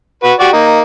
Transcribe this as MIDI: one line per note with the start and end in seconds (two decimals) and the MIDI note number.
0.24 0.34 66
0.24 0.34 71
0.40 0.49 66
0.40 0.49 67
0.40 0.49 74
0.53 0.81 58
0.53 0.81 63